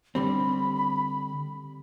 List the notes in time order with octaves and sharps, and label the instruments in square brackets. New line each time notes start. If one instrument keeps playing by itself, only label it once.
[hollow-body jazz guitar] D3 G3 C4 [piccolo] B5